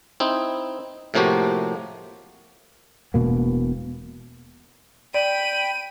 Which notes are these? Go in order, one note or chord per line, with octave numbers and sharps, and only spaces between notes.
C4 D#4 E4
A2 C3 F3 A#3 F#4 G4
E1 B2 A#3
D5 G5 B5 D#7